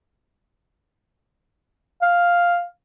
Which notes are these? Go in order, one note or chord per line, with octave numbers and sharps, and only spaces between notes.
F5